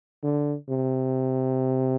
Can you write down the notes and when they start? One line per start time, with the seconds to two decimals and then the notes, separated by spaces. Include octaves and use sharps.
0.23 D3
0.70 C3